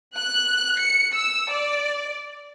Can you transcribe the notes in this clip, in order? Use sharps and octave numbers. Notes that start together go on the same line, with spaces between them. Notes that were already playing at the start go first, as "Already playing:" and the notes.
F#6
C#7
E6
D5